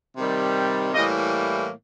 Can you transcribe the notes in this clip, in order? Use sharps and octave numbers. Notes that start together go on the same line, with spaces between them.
C3 D#3 G3
A2 E3 G3 A#3 D#5